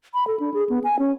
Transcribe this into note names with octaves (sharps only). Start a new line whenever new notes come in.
B5
A4
D4
G#4
B3
G#5
C#4